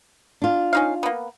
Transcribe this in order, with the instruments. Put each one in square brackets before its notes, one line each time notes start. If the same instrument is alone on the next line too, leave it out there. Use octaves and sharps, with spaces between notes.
[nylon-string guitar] D4 F4
[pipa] C#4 D#4 F5
A#3 B3